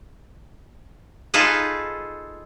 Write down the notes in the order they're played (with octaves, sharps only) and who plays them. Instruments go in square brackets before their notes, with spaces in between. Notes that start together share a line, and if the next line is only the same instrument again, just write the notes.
[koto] D#4 F4 G#4 A4 B4